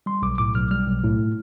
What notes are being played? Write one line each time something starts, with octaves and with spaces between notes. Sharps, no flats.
G3 C6
B1 D6
A2 D6
B1 F6
G3 F6
B1
A2